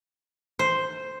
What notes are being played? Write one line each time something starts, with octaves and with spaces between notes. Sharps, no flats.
C5